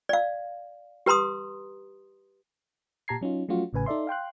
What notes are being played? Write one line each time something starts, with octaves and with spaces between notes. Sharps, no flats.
D5 F5
G4 B4 A#5 C6 D#6
A#2 G4 A5 A#5 G#6 C7
F#3 C#4 D#4 F4
F3 F#3 A3 C#4 F4 F#4
A1 A2 C#3 B4 G#5
D#4 A4 D5 E5 C6
F5 G5 C6 F#6